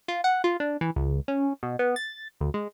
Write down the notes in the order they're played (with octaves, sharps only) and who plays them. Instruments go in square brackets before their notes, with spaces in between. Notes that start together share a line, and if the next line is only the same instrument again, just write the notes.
[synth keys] F4
F#5
F4
D4
E3
C#2
C#4
B2
B3
A6
D2
G#3